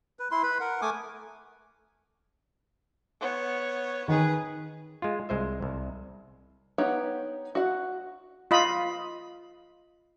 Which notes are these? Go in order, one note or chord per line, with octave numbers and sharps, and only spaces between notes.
B4
E4 C6
B4 B5
A#4 F#5
A3 G#5 D6 D#6
B3 C#5
D#3 G#4 B4
G#3 F4
C2 G#3 C5 E5
C2
B3 D#4 G4 C#5 F#5
F#4 F#5
F4 D#5 B5